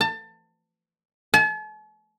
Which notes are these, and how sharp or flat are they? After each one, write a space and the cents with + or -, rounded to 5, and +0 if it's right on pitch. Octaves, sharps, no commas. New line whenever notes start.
A5 +25
A5 -45